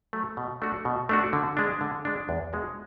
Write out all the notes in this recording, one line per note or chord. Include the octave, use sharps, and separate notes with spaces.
F#3 A3
B2
A3 D4 F#4
B2
A3 D4 F#4
D3
G#3 D4
D3
G#3 D4
E2
B2 G#3 D4 F#4